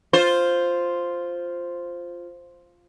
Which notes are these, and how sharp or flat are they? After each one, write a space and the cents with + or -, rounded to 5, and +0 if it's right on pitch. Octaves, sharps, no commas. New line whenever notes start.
F4 +0 C5 +0